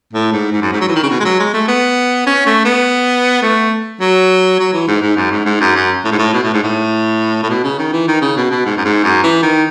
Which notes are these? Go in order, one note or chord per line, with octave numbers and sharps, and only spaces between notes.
A2
G#2
G#2
F#2
G#2
F#3
E3
D#3
C#3
B2
G#3
F#3
G#3
A3
B3
C#4
A3
B3
A3
F#3
F#3
E3
G#2
G#2
F#2
G#2
G#2
F#2
F#2
A2
G#2
A2
B2
A2
G#2
A2
A2
B2
C#3
D#3
E3
D#3
C#3
B2
B2
G#2
F#2
G#2
F#2
E3
D#3